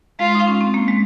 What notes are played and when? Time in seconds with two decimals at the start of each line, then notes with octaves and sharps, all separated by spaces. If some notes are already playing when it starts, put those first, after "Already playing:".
0.19 G#3 F4
0.35 D#4
0.47 C#4
0.61 C4
0.74 A#3
0.88 G#3